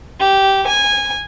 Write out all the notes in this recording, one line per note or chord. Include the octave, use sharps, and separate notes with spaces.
G4
G#5